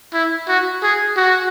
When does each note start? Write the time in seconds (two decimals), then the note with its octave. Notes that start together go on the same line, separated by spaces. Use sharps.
0.14 E4
0.48 F#4
0.83 G#4
1.17 F#4